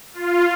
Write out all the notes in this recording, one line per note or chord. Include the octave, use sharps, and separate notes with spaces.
F4